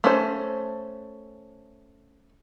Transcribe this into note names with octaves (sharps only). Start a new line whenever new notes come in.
A3 C#4 C5